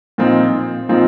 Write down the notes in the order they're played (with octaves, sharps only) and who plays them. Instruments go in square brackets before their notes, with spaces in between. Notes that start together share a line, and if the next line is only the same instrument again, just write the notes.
[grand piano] A#2 F3 C4 D#4
A#2 F3 C4 D#4